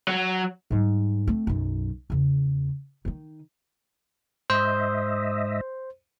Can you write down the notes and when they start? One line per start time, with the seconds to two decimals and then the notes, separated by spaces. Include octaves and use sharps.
0.08 F#3
0.71 G#2 G3
1.27 A3 C4
1.47 B1 F#2
2.10 E2 C#3
3.05 D#3 D#4
4.50 G#2 C5 D#5 E5